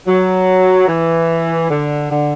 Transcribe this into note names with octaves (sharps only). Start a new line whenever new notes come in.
F#3
E3
D3
D3